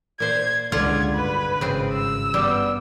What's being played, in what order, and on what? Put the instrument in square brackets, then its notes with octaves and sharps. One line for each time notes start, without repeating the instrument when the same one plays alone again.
[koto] A#2 C5 [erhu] G#6
[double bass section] C#2 [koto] D3 F4 F#5 [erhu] G#6
[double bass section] G#1 G2 [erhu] B4
[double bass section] G#1 [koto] C#3 C4
[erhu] E6
[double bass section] G2 B3 [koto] G3